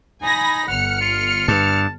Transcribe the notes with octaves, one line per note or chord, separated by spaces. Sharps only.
D#4 G#5 B5 A#6
G1 F#5 F6 C#7
F4
G2 A5